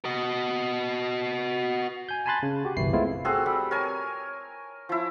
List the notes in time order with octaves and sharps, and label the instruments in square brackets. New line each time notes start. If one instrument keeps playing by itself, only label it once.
[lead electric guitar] F#4 D#5
[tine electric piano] G#5 G6
G#5 A5 B5 C6 F#6 A6
C#3
F#4 G4
G1 C2 E3 E4 C7
G#3 A3 B3 C4 E4 F4
[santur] C4 F#4 G#4 A4
G3
A#4 C#5 G#5
F3 E4